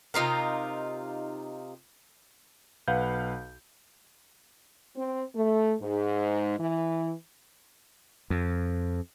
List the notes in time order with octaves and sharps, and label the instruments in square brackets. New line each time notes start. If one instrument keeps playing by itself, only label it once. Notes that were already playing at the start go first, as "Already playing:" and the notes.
[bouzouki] C3 D#4 F4 A#4
[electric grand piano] B1 B4 F5 F#5 G6
[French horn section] C4
A3
G#2
E3
[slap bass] F2